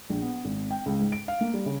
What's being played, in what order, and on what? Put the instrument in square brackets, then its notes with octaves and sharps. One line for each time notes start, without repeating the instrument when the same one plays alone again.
[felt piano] A#1
B3
G#1
G5
C#2
G#2
D7
F5
A#3
G3
C#3